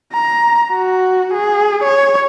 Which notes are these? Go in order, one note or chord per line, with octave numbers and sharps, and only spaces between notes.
A#5
F#4
G#4
C#5